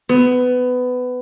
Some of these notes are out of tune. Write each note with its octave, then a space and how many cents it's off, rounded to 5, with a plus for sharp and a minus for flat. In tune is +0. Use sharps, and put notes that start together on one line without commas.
B3 +20